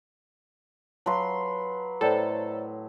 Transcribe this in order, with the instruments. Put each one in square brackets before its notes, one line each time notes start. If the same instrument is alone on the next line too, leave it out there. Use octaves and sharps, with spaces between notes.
[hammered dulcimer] F#3 B4 C6 [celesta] F5 A5
[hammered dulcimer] A2 [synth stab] A4 [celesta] C5 D5 A#5